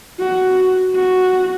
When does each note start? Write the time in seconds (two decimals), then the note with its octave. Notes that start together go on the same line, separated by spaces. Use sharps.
0.19 F#4
0.95 F#4